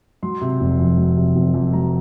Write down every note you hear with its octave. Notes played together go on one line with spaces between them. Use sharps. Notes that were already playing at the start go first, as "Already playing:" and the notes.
F#3 C6
C3
F1
F2
F#3
C3
F1
F2
F#3 A#5